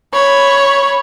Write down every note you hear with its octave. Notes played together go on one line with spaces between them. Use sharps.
C#5 B5